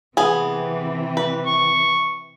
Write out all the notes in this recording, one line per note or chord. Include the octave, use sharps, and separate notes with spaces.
C3 E3 B3 C4 G#4
B4
C#6